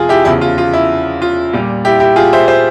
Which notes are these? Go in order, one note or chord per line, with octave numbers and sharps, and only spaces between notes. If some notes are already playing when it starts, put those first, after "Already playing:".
Already playing: F2 C3 F4 G#4
E4 G4
E2 C#3 F3 E4
F4
F4
E4
F4
A#2 G3
E4 G4
E4 G4
F4 G#4
C5 E5
C5 E5